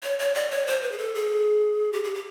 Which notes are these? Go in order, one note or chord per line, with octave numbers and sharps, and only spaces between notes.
C#5
C#5
D5
C#5
C5
B4
G#4
A4
G#4
G4
G#4
G4